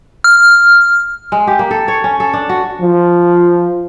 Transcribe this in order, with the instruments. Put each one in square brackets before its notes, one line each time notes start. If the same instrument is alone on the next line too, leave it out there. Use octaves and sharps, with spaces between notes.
[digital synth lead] F6
[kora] G#3
G4
A#3
A4
C#5
C#4
A4
D4
F#4
[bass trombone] F3